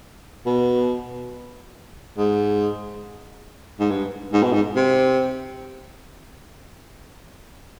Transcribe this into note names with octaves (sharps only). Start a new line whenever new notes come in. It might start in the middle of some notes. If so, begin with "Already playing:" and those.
B2
G#2
G#2
G2
G#2
B2
G#2
C3